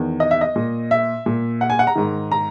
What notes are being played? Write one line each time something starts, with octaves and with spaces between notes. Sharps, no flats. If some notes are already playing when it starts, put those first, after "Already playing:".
Already playing: E2 D#3
D#5
E5
D#5
A#2
E5
A#2
F#5
G#5
F#5
A#5
G#2 D#3
A#5